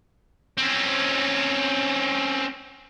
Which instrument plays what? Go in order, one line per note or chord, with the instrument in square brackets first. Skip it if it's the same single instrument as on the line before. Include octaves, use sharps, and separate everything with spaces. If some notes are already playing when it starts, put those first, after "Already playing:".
[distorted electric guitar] C4 C#4